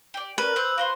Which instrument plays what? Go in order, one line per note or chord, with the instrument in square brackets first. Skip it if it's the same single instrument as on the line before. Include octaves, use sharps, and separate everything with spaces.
[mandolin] G4 D5
[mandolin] C#4 [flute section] A#4 D5 [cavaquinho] B4
[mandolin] C5 F#6 G6 [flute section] E6
[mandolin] F#4 C5 C6 [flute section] F5